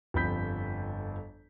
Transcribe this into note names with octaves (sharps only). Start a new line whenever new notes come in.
G1 F2 F3 B5 G6 B6